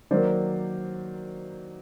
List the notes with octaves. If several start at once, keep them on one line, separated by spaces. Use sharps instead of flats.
D#3 F#3 A#3 C5 D5